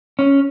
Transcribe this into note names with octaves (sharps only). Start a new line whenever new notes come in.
C#4